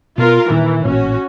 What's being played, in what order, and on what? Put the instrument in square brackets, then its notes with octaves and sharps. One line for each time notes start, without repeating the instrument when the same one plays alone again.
[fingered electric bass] B2 B3 [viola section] F4 A#4
[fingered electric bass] A#2 D#3 [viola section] E3
[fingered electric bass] A1 A#2 [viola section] C#4 F#4